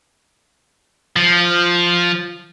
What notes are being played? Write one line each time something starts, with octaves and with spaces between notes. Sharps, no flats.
F3